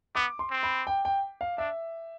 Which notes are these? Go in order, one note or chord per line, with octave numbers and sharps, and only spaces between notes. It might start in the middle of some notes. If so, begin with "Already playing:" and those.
B3 D6
C6
C4
B5
G5
G5
F5
D4 E5